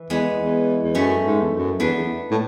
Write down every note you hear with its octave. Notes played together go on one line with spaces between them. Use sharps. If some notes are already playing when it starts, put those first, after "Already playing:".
Already playing: E3
E2 G#3 B3
E2
E2
F#2 A3 C#4
G#2
E2
F#2
E2 B3 D4
E2
A2